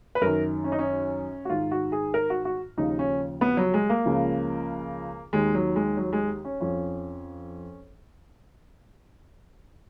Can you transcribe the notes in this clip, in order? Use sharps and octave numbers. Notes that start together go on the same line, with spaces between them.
B4
F#2 D#3 A#4
C#4
D#4
C#4
F#4
G#2 D#3 F4
F#4
G#4
A#4
F#4
F#4
D#2 C#3 F3 D#4
C#4
B3
F#3
G#3
A#3
C#2 C#3 F3
D#2 D#3 G#3
F#3
G#3
F#3
G#3
C#4
F2 F3 C#4